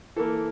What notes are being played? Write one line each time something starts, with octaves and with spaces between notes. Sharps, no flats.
E3 A#3 A4